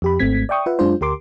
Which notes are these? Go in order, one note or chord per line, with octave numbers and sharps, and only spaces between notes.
F2 G4 B5
G#1 G#2 A3 C4 G#6 B6
D5 E5 G5 C#6 D#6
F4 B4 E5 F#5
F#2 G#3 D4 F4 C5
D2 G4 A#4 C6 D6